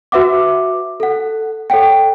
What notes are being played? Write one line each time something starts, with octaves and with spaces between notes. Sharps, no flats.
F#4 B4 E5 F#5 D6
A4 F#5
A4 C#5 F#5 G5